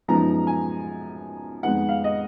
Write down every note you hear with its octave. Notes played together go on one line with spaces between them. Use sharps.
F#2 F3 G#3 B3 D#4 A#5
G#5
F2 D#3 G#3 B3 D#4 F#5
F5
D#5